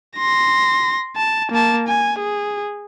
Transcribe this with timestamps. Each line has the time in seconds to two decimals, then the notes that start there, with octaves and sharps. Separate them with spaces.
0.18 C6 A#6
1.16 A5
1.51 A#3 A5
1.88 G#5
2.19 G#4